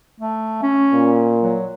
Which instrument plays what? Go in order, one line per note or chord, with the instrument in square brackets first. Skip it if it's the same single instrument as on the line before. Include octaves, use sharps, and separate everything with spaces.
[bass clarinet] A3
C#4
[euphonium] A#2
[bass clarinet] F#3